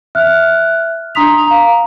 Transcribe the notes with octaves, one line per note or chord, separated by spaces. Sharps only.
E5 F6 F#6
D4 A#5 C6 D#6 B6 F7
F5 A#5